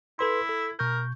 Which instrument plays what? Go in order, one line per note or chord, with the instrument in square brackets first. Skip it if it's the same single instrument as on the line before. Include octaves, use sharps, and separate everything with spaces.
[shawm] E4 [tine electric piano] A4 B4 C6
[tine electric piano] A4
[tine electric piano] B2 C#6 G6 [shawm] A#4